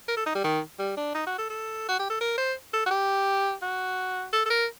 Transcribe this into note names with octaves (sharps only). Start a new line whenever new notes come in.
A#4
A4
D#4
G3
D#3
G3
D4
D#4
F#4
A4
A4
F#4
G4
A4
A#4
C5
A4
F#4
G4
F#4
A4
A4
A#4